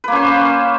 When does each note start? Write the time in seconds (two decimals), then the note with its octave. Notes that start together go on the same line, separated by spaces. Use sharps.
0.04 B4
0.08 A#3
0.12 C#4
0.16 C5